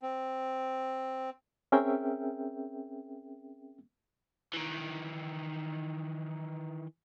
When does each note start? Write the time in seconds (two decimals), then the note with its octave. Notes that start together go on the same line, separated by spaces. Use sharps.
0.02 C4
1.72 C4 C#4 G#4 A#4 E5 G5
4.53 D#3 E3